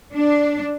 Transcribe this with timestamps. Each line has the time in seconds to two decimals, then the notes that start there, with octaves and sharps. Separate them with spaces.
0.13 D4